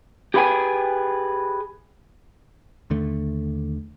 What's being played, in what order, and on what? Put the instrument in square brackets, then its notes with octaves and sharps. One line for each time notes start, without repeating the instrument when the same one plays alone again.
[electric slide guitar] G4 G#4 B4 C#5 G5 G#5
[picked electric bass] D#2 D3 A3